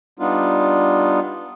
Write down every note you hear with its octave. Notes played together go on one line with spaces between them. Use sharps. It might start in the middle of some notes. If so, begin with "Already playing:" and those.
G3 B3 D4 D#4 F4